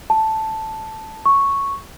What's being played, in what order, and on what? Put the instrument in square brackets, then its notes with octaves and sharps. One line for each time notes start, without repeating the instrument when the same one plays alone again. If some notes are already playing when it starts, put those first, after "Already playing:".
[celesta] A5
C#6